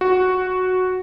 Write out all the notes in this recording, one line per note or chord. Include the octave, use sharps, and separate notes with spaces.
F#4